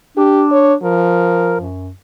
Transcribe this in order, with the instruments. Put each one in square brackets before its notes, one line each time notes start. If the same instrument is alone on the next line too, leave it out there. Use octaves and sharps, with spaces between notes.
[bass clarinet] D4 [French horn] G4
[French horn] C#5
[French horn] F3 [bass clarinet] A#4
[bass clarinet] F#2